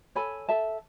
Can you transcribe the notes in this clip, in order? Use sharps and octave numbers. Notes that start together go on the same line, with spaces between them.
A4 C#5 G#5 B5
A4 E5 A5